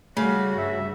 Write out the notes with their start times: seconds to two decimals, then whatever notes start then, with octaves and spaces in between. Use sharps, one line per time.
0.17 C#3 G3 A3 F#4
0.58 G2 E5